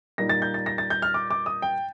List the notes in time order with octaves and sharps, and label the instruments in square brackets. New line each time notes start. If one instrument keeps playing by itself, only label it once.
[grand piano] A#2 G3 A#3 D#4 A#6
A6
G6
A6
A#6
A6
G6
F6
D6
D6
D#6
G5